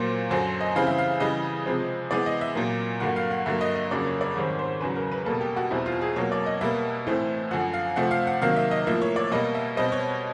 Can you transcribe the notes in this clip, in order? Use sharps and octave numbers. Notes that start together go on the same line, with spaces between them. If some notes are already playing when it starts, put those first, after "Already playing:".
Already playing: A#2 F#3 A#3 C5
F#2 D3 F#3 C5
D#5
C#3 E3 G3 C4 F5
E5
F5
C#3 E3 G3 D#5
C3 F3 G#3 C4
C3 E3 G#3 B3 D5
D#5
E5
A#2 F#3 A#3
G2 D3 F#3 A#3 F#5
F5
F#5
G2 D3 F#3 A#3 E5
D#5
D#5
F2 C#3 F#3 A#3 D5
C#5
D5
G#2 D#3 G3 C4 C#5
C5
E2 C#3 F#3 B4
A#4
B4
B2 G3 A#3 A4
G4
F#4
E2 B2 G3 C4 E4
F4
G#4
B2 F#3 A#3 C#5
D5
D#5
B2 G3 A#3 E5
A2 E3 A3 C4
F#2 D3 F3 F#5
F5
C3 F3 A3 C4 F#5
F5
F#5
C3 D#3 F#3 A#3 F5
E5
D#5
A2 F3 A#3 E5
C#5
D5
B2 G3 A#3 D#5
E5
B2 G3 C4 D#5
C#5